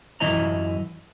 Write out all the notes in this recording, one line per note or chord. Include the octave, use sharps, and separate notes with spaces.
F#2 E3 E4 D#5 A#5